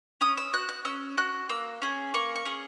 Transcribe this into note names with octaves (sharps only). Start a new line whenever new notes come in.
C#4 D#6
E6
F#4 F#6
F#6
C#4 E6
F#4 F#6
A#3 E6
C#4 G#4
A#3 C#6
C#6
C#4 G#4